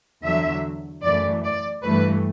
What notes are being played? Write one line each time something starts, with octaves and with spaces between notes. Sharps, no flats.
E2 D3 F#3 E5
F#2 E3 A3 D5
D5
G2 E3 A3 B4